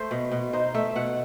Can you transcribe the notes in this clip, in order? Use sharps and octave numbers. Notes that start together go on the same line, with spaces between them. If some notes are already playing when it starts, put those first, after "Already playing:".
Already playing: A3 C5
B2
B2
D#4 C5
A3 E5
B2 F#5